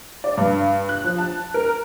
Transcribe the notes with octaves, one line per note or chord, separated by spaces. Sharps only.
D5
G2
F#6
F3
A5
A#4